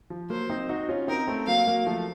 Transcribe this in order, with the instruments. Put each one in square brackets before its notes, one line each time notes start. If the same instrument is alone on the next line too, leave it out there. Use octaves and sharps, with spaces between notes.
[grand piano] F3
[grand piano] F#3 A#3 [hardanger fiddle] C5
[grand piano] C4 D#4
D#4 F#4
C#4 F4
[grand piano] C4 D#4 [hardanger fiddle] A#4
[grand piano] A3 C4
[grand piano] F#3 A#3 [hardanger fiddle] F5
[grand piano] F#3 A#3
F3 A3